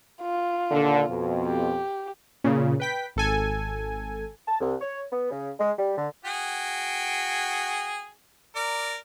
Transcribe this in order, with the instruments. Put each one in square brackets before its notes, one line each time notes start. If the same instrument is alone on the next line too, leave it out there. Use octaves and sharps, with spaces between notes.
[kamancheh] F4
[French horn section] D#2 A#2 D3
F2 B2
[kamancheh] G4
[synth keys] A#2 C#3
B4 G5 B6
G#1 A4 G#5
[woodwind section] A5
C2
C#5
B3
C#3
G#3
G3
D3
[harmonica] F#4 G#4 G5
A#4 D5